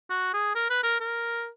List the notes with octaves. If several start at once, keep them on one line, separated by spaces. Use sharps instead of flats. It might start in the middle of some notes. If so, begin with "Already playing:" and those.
F#4
G#4
A#4
B4
A#4
A#4